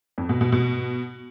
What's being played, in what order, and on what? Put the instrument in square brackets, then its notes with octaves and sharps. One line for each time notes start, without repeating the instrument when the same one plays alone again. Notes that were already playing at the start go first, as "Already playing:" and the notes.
[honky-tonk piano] F2
B2
B2
B2